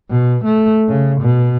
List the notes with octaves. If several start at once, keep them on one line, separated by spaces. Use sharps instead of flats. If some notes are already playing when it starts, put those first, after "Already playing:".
B2
A3
C#3
B2